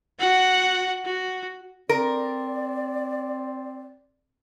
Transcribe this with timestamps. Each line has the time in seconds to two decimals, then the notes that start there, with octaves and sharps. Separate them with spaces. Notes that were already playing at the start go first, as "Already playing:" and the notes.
0.19 F#4 F#5
1.05 F#4
1.89 C4 A#4 D5